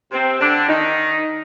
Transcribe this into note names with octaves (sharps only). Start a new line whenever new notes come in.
C3 C4
D3 D4
D#3 D#4